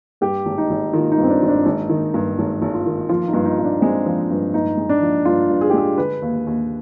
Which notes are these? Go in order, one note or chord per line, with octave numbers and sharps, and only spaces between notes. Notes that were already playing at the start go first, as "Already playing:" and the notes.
G2 G4
G#1
D#4
G#1
D#3 F4
D#4
G2
C4
D4
G#1
D4
G#1 D#4
D#3
G2
G#1 D#4
G#1
F4
D#3
F3 F4
D#4
G2
D#4
G2
D4
G#3 C4
F3
G2
G2 D#4
G#3
D4
F3
G2 F4
G2
G#4
G4
G#3 G#4
D3 B4
D#2
D#2